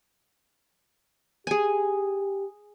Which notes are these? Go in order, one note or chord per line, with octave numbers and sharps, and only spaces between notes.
G4 G#4 G#5